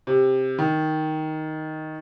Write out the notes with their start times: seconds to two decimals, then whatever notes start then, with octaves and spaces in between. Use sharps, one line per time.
0.07 C3
0.59 D#3